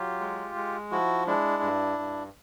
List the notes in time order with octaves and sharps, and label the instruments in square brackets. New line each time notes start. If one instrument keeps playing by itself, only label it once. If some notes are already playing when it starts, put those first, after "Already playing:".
Already playing: [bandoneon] F#3 F4 G4
G#3
G#3
F3 E4 F#4
G#3 D4 E4
G2
G2